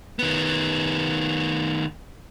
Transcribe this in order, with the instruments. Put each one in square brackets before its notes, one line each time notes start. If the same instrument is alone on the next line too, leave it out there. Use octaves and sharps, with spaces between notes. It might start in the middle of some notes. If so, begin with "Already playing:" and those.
[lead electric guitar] D#3 B3